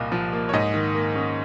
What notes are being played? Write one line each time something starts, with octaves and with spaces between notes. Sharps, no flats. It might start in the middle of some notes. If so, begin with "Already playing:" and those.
Already playing: C2 A#2 D#5 F5
F3
A#3
C#5
G#2 D#5
D#3
A#3
C#4